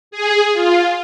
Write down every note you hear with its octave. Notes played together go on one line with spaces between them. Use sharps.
G#4
F4